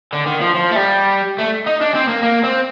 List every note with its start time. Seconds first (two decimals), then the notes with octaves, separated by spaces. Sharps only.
0.13 D3
0.26 D#3
0.41 F3
0.54 F3
0.71 A3
0.76 G3
1.39 A3
1.66 D#4
1.81 D4
1.95 C4
2.09 A#3
2.23 A#3
2.44 C4